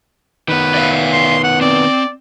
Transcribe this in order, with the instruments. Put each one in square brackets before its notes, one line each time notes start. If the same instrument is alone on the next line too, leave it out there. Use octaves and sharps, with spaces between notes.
[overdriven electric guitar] D#3 B3 [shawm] B4
[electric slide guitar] D5 E5 F5
[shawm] C6
F#5
[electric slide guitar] C4 [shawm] D5